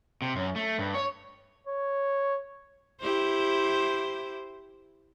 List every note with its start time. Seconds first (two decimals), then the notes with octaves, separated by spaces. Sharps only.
0.22 C3
0.36 F#2
0.56 A3
0.79 G2
0.94 C#5
1.67 C#5
3.01 E4 G4 C5